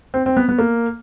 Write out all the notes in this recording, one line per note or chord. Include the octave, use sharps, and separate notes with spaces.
C4
C4
B3
B3
A#3